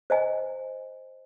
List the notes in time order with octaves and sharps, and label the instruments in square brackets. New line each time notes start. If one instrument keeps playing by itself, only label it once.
[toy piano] C5 D#5 G#5